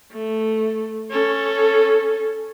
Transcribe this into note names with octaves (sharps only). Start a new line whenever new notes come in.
A3
C#4 A4